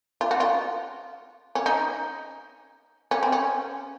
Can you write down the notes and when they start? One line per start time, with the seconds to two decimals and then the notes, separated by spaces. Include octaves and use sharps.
0.21 F4
0.31 F#4
0.40 F4
1.55 C#4
1.66 D#4
3.11 C#4
3.23 C4
3.32 C#4